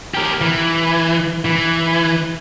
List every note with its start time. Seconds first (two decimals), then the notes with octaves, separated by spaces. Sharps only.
0.15 G4 A#4
0.41 E3
1.45 E3